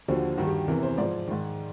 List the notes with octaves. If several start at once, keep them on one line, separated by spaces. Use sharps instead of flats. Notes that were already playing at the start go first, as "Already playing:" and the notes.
D#2 D3 F3 F#4
G2 D#3 F#4
G4
E2 C3 E3 A#4
C5
G#2 F3 D5
G#2 D#3